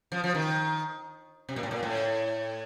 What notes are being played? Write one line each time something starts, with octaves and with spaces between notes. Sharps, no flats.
F3
F3
D#3
C3
A#2
A2
A#2
A2